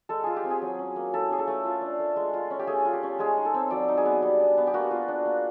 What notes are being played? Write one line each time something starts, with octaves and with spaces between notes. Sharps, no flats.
G#3 A4
F4 G#4
G4
C4
G#4
F#3
C#4
A#3
E4 A4
C#4 G#4
A4
A3
F4
D4
A3
G#3
F4
C#4
G4
A3 G#4
F4
G4
C#4
G#3 G#4
D#4
A4
C4
F#3 D5
D#4
G#4
B3
G3
D4
B3
G4
A#3 F#4
F4
D4
A#3